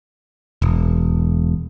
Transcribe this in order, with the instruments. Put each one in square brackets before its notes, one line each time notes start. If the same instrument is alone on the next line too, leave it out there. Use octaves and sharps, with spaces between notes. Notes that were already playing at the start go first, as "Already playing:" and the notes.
[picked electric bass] E1